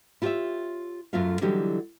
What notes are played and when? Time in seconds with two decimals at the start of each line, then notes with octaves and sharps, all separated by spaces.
0.22 E4 F4 G4 A4 C#5 E5
1.13 F#2 F#3 A3 F4 E5 F5
1.41 D3 E3 F#3 G3 D#4 G4